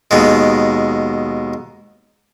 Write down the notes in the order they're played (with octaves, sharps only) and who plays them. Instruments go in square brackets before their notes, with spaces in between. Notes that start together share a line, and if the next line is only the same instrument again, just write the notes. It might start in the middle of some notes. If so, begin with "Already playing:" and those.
[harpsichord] D#2 B2 G#3